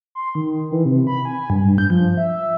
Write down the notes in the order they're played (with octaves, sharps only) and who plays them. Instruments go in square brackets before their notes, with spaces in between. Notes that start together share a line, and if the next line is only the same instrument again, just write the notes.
[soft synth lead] C6
D#3
E3
C3
B5
G#5
G2
G2
G6
F3
E5